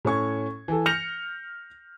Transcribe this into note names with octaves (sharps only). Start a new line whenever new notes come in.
A2 C#4 C#6 G#6
E3 A4
F6 G6 A#6 C#7 F7